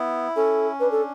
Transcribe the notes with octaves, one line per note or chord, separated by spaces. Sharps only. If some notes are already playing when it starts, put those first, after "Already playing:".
Already playing: B3 E4
C#4 A4
D4 B4
A4